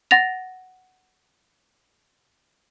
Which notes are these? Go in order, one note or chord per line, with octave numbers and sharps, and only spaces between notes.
F#5 A6 A#6 F7